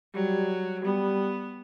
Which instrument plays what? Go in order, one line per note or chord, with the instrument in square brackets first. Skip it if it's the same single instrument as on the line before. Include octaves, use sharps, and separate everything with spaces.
[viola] F#3 [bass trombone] G3
[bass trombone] G3 [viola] B3